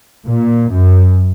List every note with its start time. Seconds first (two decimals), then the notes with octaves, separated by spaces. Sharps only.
0.27 A#2
0.72 F#2